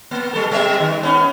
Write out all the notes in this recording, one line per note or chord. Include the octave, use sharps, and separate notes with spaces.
A#3
G3 A4
G3 C4 E5
D#3
B3 C#4